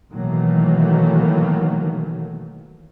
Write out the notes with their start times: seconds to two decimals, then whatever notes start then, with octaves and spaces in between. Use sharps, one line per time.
0.11 B2 D#3 E3 F#3 A3 A#3